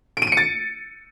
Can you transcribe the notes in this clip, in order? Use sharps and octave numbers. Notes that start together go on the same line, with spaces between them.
D7
D#7
D7
C#7
A6